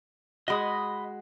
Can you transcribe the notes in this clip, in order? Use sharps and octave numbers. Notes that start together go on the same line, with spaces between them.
G#3 F#4 D#5 B5 D#6